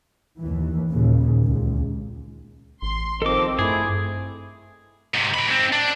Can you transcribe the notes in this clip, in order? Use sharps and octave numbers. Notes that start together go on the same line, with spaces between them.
D#2 E3
D#2 A#2 C#3
C#2
A1 C6
D#3 F3 C4 A4 D#5 D6
G2 A3 E4 G#4
G#2 C3
A#4 B5
G#2 C4
D4